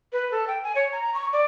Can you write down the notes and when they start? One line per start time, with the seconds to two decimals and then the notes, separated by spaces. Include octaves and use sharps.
0.12 B4
0.31 A4
0.47 G5
0.63 G#5
0.75 C#5
0.92 A#5
1.14 C#6
1.33 D5